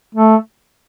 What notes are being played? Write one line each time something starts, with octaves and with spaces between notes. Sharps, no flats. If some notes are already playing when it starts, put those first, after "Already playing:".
A3